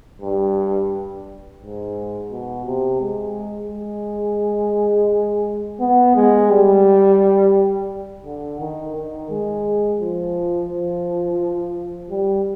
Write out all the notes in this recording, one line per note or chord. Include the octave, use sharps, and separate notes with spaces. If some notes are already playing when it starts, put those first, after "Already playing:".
G2
G#2
B2
C3
G#3
G#3
B3
G#3
G3
D3
D#3
D#3
G#3
F3
F3
G3